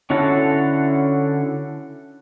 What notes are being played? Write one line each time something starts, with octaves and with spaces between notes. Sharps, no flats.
D3 C#4 E4 F#4 A4